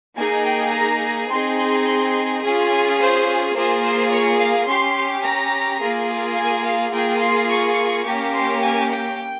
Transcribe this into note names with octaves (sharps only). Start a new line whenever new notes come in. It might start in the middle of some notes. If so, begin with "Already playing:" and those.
A#3 D#4 G#4 G#5
G5
A#5
C4 D#4 G#4 C6
C6
C6
C#4 F4 G#4
G#5
C5
A#3 F4 G#4 C5
C5
C#5
F5
C#4 G4 C6
A#5
A#3 F4 G#4
G#5
F5
A#3 F4 G#4 G5
C6
C#6
A#3 C#4 G4
C6
G#5
G5